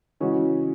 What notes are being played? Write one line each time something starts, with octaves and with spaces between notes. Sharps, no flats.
C#3 E3 G#3 C#4 F#4